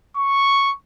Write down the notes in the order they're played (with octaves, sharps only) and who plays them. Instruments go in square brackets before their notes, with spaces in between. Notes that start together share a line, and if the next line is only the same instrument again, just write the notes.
[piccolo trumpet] C#6